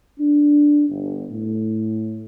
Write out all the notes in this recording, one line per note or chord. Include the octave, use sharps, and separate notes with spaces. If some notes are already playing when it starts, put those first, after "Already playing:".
D4
G1
A2